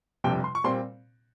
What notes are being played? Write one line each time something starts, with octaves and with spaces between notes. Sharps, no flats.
G1 F2 C3 G3 G5
C6
C#6
A#2 G3 C4 C6